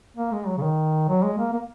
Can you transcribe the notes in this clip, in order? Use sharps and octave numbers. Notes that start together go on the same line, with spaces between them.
A#3
G#3
F#3
C#3
D#3
F#3
G#3
A#3
A#3